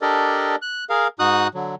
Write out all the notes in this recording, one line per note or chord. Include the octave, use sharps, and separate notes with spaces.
D4 G4 A4 A#4 D5 D#5
F#6
G#4 A#4 F5
G#2 D#4 F#4 D#6 F#6
D3 F#3